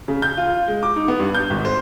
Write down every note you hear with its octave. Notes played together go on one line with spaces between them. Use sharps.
C#3
G6
F4
G#3
D6
D#4
B3
G2
G6
G#1
C5